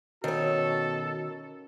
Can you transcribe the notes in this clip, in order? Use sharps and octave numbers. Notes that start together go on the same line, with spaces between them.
B2 D#3 C#4 F#4 A4 C#5